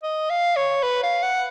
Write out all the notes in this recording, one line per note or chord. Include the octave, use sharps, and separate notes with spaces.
D#5
F5
C#5
B4
F5
F#5